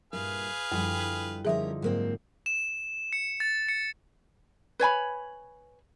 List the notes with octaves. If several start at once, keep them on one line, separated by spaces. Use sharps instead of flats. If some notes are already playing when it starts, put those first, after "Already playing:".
G2 A#2 E4 G#4 B4 F5
F#2 D3 F3 G3 E4 A4
D3 F3 G3 C#4 D#4 G#4 A#4 E5
G#2 F#3 A#3 C4
E7
C#7
A6
C#7
B4 C#5 G#5 B5